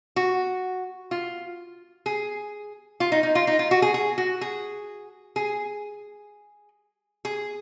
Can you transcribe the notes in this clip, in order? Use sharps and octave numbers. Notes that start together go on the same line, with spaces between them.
F#4
F4
G#4
F4
D#4
D#4
F4
D#4
F4
F#4
G#4
G#4
F#4
G#4
G#4
G#4